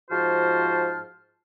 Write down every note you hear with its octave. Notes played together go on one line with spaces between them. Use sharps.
G#2 F3 F#4 C5 A5 F6